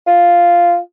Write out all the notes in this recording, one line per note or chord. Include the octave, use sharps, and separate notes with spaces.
F4